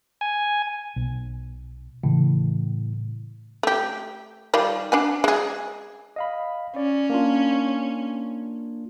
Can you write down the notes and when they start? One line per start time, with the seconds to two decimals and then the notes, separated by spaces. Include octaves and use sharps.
0.21 G#5
0.96 B1
2.04 A2 C#3 E3
3.63 A3 G4
4.54 D#3 G3 F4
4.92 D4 F#5 G#5
5.24 G#3 G#4
6.16 D#5 F5 B5
6.76 C#4 D5
7.10 A#3 D4 F4